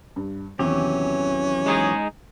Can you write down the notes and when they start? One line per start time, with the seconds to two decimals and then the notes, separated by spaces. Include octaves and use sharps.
0.16 G2
0.59 E2 C3 D#3 E3 F#3 C#4 G4
1.66 G#3 D#4 G#4